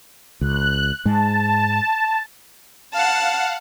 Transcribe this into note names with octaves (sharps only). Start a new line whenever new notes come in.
C#2 F#6
G#2 G#3 A5
F5 F#5 A5